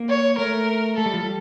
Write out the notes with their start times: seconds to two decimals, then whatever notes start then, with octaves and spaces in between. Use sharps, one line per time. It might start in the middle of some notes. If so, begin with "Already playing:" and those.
Already playing: A#3
0.09 C#5
0.38 A3 A#4
0.97 A3 A4
1.06 G3
1.13 F3
1.23 G3